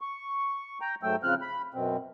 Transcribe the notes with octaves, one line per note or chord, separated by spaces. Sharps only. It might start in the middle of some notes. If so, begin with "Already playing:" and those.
C#6
G5 A#5
G#2 F#3 A3 G5 E6
C#3 F3 C4 F6 F#6
B5
F#2 B2 C4